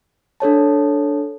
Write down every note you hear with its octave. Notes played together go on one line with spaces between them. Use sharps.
D4 A4 C#5 A5